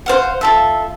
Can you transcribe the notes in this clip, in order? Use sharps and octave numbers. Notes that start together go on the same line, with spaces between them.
C5 F5 F#5
F4 A4 E5